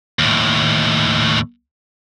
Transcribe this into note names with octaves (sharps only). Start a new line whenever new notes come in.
D#2 A2